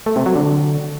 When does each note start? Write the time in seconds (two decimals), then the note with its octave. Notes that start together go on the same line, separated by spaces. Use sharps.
0.06 A3
0.16 C3
0.26 F#3
0.36 D3